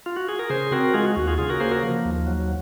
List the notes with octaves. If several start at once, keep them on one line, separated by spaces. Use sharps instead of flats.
F4
F#4
G#4
A#4
C#3 G#4 C5
C4 F#4 A#4
G#3 F4 G#4
F#4
D#2 F#4
F4 G#4
C#3 F4 G#4
F#4 A#4
A#3 G#4 C5
F#4 A#4
F3
D#2
F#3